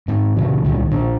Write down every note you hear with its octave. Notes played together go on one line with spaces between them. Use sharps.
G#1 G#2
A#2 C#3 E3
C#2 A#2 D#3
A#2 D4